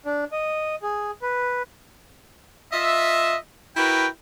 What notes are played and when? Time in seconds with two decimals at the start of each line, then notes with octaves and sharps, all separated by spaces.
0.06 D4
0.32 D#5
0.82 G#4
1.22 B4
2.72 F4 D#5 E5
3.77 E4 F#4 A#4 B4 G5